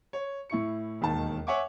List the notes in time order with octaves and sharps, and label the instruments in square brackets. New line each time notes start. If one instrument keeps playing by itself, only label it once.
[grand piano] C#5
A2 E4 C#6 C#7
E1 D#2 D#3 A5
C#5 E5 F#5 G#5 C#6 D6